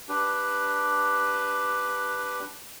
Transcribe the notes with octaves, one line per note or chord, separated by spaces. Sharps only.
D4 G4 B4